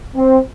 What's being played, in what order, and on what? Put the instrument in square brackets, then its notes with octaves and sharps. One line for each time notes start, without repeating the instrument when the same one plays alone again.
[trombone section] C4